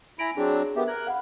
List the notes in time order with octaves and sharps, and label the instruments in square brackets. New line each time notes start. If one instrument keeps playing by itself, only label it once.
[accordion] E4 A#5 B5 [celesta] G#5 D7
[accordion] F#3 C4 D4 [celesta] G#4
[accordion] B3 G4 [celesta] A#4 B4 E5
[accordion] A#4 F#6 [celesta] G#6
[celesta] F5 F#5 B5